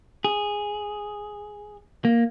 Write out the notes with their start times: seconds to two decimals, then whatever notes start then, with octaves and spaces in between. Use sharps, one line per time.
0.24 G#4
2.05 A#3